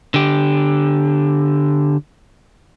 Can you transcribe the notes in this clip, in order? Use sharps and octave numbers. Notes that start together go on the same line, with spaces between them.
D3 G4